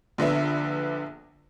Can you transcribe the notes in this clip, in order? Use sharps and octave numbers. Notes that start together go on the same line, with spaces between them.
A#1 D3 B3 E5